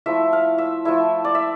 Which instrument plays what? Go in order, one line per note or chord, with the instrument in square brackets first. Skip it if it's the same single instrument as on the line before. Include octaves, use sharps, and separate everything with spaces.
[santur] F3 A3 E4 E5
F5
E5
F3 A3 E4 E5
D5
E5